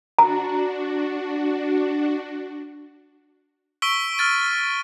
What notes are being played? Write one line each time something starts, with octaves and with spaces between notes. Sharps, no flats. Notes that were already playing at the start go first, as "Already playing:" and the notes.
D4 F#4 A#5
C#6 E6 B6 D7 G7
E6 F6 A6 D#7